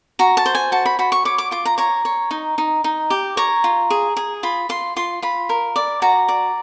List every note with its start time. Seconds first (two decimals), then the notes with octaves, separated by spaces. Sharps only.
0.19 F#4 A#5
0.37 A5
0.46 C5
0.55 G#5
0.72 F#4 A5
0.86 B5
0.99 F#4 B5
1.12 C#6
1.25 C#5 D6
1.38 D6
1.51 F4 D6
1.65 A#5
1.78 C#5 A#5
2.05 C#5
2.31 D#4
2.58 D#4
2.84 D#4
3.10 G4
3.37 C#5 A#5
3.64 F4
3.90 G#4
4.17 G#4
4.43 F4 B5
4.69 F4 C6
4.96 F4 C6
5.22 F4 B5
5.49 A#4
5.76 D5
6.02 F#4 A#5
6.28 D5